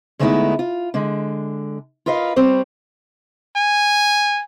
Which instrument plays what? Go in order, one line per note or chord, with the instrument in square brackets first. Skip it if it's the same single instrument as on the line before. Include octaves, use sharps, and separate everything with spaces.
[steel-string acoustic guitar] D3 G#3 A3 B3 D#4 E4
F4
D3 G#3
F4 A#4 B4 D#5 F5
G3 C4 C5 C#5
[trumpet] G#5